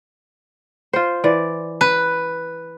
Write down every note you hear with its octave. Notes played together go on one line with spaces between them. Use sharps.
F4 C5
E3 D5
B4